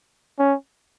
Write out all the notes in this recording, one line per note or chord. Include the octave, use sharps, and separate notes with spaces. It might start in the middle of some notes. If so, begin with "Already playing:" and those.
C#4